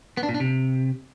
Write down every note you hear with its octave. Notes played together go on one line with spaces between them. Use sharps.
B3
D4
A#2
D4
C3